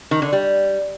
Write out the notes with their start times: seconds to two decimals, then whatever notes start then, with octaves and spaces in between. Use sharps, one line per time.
0.11 D#3
0.22 D3
0.33 G3